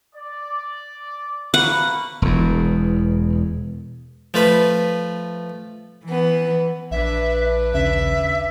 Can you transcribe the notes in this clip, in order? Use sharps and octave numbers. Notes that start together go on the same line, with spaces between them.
D5
A#3 F#4 B4 F#5
E1 E2
F3 A3 B4
E3 B3
A#1 D4 B4 E5
D#2 C#3 E5